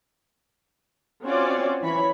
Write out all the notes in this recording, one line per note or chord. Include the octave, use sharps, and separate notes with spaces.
C4 C#4 F4 F#4 C#5 D5
E3 C#5 B5